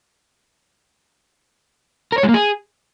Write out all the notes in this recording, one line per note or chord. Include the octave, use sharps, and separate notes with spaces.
A#4
C#5
G#3
A#3
G#4